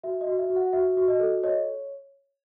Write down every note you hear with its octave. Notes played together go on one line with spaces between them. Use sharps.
F#4 E5
D#5
F#4
E5
F#4
F#5
F#4 E5
F#4
D#5
A4
C#5 D#5